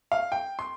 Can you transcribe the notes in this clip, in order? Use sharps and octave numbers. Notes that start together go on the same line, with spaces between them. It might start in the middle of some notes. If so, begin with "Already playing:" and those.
F5
G5
C6